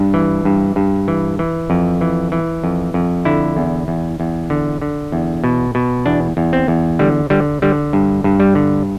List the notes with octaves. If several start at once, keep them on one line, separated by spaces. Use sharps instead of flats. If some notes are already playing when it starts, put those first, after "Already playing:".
Already playing: G2 D4
E3
G2
G2
E3
E3
F2
E3
E3
F2
F2
D3 E4
E2
E2
E2
D3
D3
E2
B2
B2
E2 D4
E2
C4
E2
D3 G3
D3 G3
D3 G3
G2
G2
G3
D3